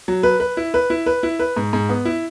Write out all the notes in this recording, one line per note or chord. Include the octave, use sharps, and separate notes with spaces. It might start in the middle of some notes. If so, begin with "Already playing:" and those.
F#3
B4
B4
E4
B4
E4
B4
E4
B4
G#2
G#2
B3
E4